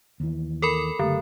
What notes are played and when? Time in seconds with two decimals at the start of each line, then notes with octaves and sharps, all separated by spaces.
0.20 D#2 E3
0.62 A4 A#4 B5
0.99 F#1 D3 A3